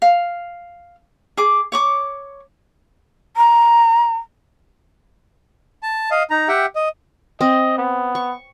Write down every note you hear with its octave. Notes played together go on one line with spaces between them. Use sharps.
F5
G#4 D6
C#5 C#6 D6
A#5
A5
D#5 F5
D#4 A#5
G4 E5 F#5 G5
D#5
C4 D#5
B3
C#6